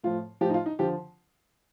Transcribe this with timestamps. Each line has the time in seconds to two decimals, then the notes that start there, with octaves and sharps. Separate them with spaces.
0.04 A2 F3 F4
0.41 A2 F3 G4
0.50 D#4
0.54 F4
0.66 D#4
0.79 D3 F3 G4